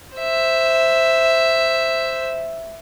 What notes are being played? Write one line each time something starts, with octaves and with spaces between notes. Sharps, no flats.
C5 E5